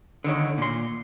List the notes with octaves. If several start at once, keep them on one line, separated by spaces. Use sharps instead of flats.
D3 D#3 C#5
A#2 C6